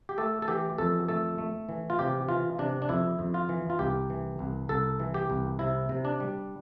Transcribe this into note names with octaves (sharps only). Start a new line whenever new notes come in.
G4
A3 A4
A4
E3 G4
F2 A4
A3 A4
A3
E3
F4
C3 G4
E3 F4
C3 D4
D4
F2 E4
F2
F4
E3
F4
C2 G4
E3
C2
C2 A4
E3
G4
C2
C3 E4
C3
D4
G3